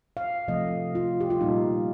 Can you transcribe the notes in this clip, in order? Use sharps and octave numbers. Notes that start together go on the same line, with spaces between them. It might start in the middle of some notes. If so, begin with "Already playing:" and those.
F5
C3 F3 A3 D#5
F4
G4
F4
A#2 G3 A#3 D#4